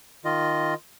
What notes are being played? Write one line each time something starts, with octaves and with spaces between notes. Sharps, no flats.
D#3 F4 D#5